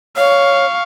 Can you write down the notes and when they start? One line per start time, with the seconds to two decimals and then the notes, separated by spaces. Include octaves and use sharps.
0.17 C#5 F5 C#6